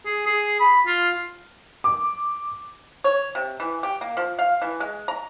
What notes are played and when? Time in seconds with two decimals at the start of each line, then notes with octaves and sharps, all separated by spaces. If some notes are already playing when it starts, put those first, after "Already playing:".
0.05 G#4
0.26 G#4
0.60 B5
0.87 F4
1.84 D6
3.04 C#5
3.35 C3
3.60 E3
3.83 G4
4.01 A#3
4.17 F3
4.39 F5
4.62 E3
4.80 G#3
5.08 A#5